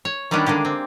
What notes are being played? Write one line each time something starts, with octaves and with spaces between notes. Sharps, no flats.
C#5
D#3 G3 B3 C#4 D4
D3 G#3 A#3 G4
C4